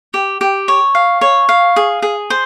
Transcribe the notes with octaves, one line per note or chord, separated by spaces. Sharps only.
G4
G4
C#5
F5
C#5
F5
G#4
G#4
C5